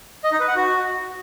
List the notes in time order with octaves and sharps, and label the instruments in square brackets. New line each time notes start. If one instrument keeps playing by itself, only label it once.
[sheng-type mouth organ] D#5
D#4
B4
F#5
F#4